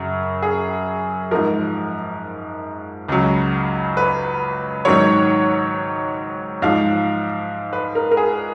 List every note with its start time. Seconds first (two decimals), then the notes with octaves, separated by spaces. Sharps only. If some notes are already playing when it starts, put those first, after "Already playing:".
Already playing: F#2 C#3 F#3
0.42 G#4
1.31 G#2 F3 A#4
3.08 C#2 C#3 F#3
3.97 B4
4.85 G#2 D#3 F#3 C#5
6.62 G#2 F3 F5
7.73 B4
7.95 A#4
8.11 A#4
8.17 G#4